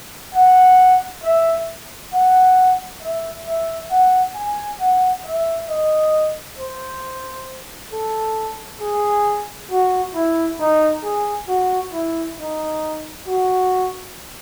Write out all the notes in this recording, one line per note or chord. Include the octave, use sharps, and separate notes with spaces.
F#5
E5
F#5
E5
E5
F#5
G#5
F#5
E5
D#5
C5
A4
G#4
F#4
E4
D#4
G#4
F#4
E4
D#4
F#4